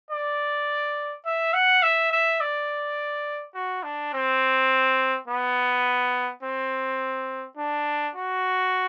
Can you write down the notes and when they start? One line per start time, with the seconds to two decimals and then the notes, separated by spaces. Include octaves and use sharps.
0.11 D5
1.26 E5
1.54 F#5
1.83 E5
2.12 E5
2.41 D5
3.55 F#4
3.83 D4
4.13 C4
5.28 B3
6.43 C4
7.58 D4
8.15 F#4